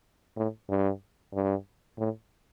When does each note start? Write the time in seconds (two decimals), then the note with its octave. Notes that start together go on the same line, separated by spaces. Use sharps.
0.36 A2
0.69 G2
1.34 G2
1.98 A2